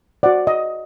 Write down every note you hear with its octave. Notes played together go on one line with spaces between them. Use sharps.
F#4 C5 D5 F#5
D#5